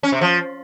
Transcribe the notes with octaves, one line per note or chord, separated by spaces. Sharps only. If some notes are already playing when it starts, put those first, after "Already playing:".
C#4
C3
F3